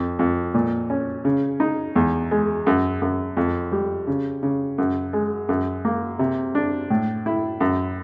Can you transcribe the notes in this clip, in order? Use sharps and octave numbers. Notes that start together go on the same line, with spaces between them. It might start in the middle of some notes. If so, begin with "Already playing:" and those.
Already playing: F2
F2
A#2
C#4
C#3
D#4
E2
G#3
F#2
F#2
F2
G3
C#3
C#3
F#2
G#3
F#2
A#3
C3
D4
A2
E4
F#2